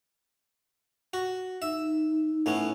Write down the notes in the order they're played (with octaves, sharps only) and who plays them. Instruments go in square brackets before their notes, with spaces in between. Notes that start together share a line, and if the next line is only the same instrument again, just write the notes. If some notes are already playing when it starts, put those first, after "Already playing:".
[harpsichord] F#4
[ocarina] D#4 [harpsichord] E5
[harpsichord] A2 B3 C#4